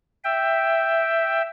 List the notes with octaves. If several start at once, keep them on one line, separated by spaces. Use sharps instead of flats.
E5 G5